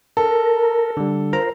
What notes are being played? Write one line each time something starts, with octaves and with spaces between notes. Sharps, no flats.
A4 A#4
D3 G3
F4 A#4 C5 A#5